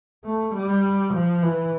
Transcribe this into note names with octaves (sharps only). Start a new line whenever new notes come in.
A3
G3
F3
E3